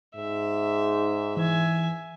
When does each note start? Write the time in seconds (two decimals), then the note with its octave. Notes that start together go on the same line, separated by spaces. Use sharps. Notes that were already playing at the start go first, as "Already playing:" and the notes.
0.15 G#2 E5
1.37 E3 E5 G#5